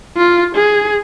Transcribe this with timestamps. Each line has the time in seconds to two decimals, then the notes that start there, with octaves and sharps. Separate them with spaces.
0.17 F4
0.55 G#4